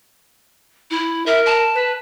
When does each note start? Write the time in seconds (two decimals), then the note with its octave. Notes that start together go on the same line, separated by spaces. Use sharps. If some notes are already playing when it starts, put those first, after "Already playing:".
0.91 E4
1.26 A#4 E5
1.46 A5
1.75 B4